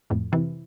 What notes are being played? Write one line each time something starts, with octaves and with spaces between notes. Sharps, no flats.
F2 A2
C3 E3